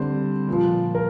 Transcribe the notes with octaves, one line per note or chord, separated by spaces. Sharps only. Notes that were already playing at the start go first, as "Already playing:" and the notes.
Already playing: D3 G3 C4 C5
A#2 F3
A#4